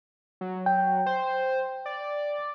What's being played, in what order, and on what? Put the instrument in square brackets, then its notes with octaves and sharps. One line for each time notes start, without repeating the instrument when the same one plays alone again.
[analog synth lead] F#3
[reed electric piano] G5
[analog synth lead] C5
D5